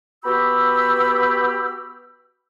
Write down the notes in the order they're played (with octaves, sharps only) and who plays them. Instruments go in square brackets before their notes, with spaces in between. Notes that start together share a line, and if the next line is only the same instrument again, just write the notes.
[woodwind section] B3 F#4 G4 B5 E6